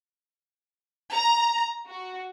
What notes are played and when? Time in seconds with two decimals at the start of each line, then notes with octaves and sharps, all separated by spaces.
1.13 A#5
1.86 F#4